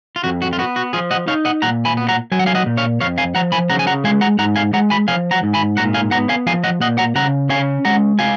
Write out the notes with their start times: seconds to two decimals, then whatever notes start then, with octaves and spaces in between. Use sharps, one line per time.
0.16 F4
0.24 F2 F#4
0.42 F#4
0.53 F4
0.59 B3 F#4
0.76 F#4
0.93 F3 F4 G#4
1.11 D#5 F#5
1.27 D#4 C#5 F5
1.45 D#5 F#5
1.62 A#2 F#5 A#5
1.85 G#5 B5
1.97 B3
2.08 F#5 A#5
2.32 F#3 G#5
2.39 F#5
2.46 F5 G#5
2.55 D#5 F#5
2.66 A#2
2.77 C#5 F5
3.01 F2 C#5 F5
3.18 F5 G#5
3.35 F3 F#5 A#5
3.52 G#5 B5
3.70 C#3 F#5 A#5
3.79 G#5
3.87 F#5 A#5
4.04 G#3 F5 G#5
4.21 F#5 A#5
4.39 G#2 F#5 A#5
4.56 F5 G#5
4.73 G#3 F#5 A#5
4.90 G#5 B5
5.08 F3 F5 G#5
5.31 F#5 A#5
5.43 G#2
5.54 G#5 B5
5.77 A#2 F#5 A#5
5.94 F5 G#5
6.11 B3 F#5 A#5
6.29 F5 G#5
6.47 F3 F5 G#5
6.64 D#5 F#5
6.81 A#2 D#5 F#5
6.98 F#5 A#5
7.15 C#3 F#5 A#5
7.50 C#4 F5 G#5
7.85 G#3 F#5 A#5
8.19 F4 F5 G#5